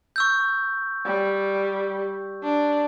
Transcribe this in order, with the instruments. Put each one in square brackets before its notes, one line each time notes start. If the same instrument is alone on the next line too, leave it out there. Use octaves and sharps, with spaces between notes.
[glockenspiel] C#6 E6 G6
[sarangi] G3
D4